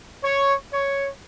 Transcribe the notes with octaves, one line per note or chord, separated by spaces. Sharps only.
C#5
C#5